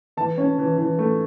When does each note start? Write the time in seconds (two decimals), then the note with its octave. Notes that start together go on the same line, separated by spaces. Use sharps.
0.17 E3 A5
0.38 C#4
0.59 E3
0.78 E3
0.99 A3